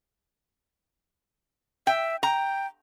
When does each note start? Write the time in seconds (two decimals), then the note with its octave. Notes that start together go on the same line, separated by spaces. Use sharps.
1.87 E5 G5
2.23 G5 A#5